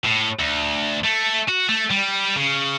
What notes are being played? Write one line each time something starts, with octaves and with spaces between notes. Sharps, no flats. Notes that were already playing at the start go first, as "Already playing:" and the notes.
A2
D2
A3
F#4
A3
G3
C#3